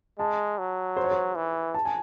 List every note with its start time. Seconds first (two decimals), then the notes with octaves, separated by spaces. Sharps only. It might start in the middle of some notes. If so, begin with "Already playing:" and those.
0.19 G#3 A5
0.58 F#3
0.97 C5
1.04 C#5
1.11 C5
1.35 E3
1.74 A5
1.85 G#5